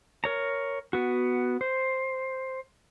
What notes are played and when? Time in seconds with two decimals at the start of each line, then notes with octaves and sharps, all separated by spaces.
0.24 A#4 C#5 A#5
0.93 B3 F#4
1.61 C5